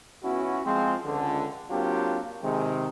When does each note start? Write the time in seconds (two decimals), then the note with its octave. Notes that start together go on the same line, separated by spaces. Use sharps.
0.23 C#2 B3 C#4 E4 F#4
0.65 F3 G#3 C4
1.05 C#2 D3
1.71 F#3 A#3 C4 D4 F4 G4
2.43 C3 D#3 G#3